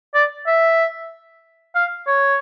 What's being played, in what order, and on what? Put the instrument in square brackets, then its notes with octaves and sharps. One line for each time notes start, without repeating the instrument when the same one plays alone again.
[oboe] D5
E5
F5
C#5